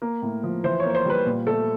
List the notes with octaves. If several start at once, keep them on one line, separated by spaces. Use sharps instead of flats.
A#3
A2
F3
E3 C5
C#5
A#3
C#5
C5
G3 B4
A#2
A3 A4